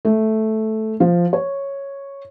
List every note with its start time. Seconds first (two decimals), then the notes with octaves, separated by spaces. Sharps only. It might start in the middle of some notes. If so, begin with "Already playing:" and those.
0.05 A3
1.00 F3
1.33 C#5